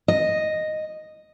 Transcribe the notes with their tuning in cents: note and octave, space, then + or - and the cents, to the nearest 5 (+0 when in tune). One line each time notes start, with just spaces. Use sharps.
D#5 -5